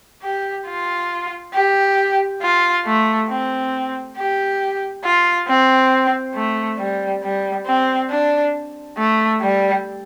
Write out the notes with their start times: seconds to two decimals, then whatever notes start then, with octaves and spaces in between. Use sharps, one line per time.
0.23 G4
0.67 F4
1.54 G4
2.42 F4
2.86 A3
3.30 C4
4.17 G4
5.04 F4
5.48 C4
6.35 A3
6.78 G3
7.23 G3
7.67 C4
8.10 D4
8.98 A3
9.41 G3